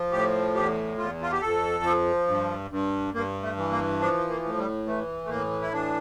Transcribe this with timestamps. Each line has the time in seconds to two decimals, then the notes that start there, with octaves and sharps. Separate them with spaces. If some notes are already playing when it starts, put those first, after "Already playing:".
Already playing: F3
0.12 A2 G4
0.55 E2 G4
0.98 E2 F4
1.22 F4
1.32 G4
1.41 F2 A4
1.84 F3
2.28 G2
2.71 G2
3.14 G2 A#3
3.42 A3
3.57 E3
3.71 A#3
4.00 F3 D4
4.29 A#3
4.44 A2
4.58 G3
4.86 E3 A3
5.25 A3
5.29 A2 A#3
5.62 E4
5.73 E3 D4